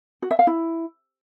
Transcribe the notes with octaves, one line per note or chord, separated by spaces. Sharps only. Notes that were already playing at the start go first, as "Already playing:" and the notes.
F#4
E5
F5
E4